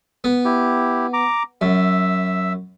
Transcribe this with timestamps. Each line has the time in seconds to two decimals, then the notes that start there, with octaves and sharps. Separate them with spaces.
0.24 B3
0.45 E4 G4
1.13 A#5 D6
1.61 F#2 E5 E6